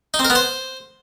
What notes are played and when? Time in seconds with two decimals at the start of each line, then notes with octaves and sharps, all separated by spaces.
0.14 D#4
0.19 C4
0.25 A#4
0.30 B3
0.35 C5